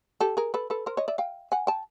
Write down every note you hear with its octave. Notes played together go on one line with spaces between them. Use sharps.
G4 A4
G#4 A#4
A4 B4
A4 B4
A#4 C5
C#5 D#5
D5 E5
F5 G5
F#5 G#5
G5 A5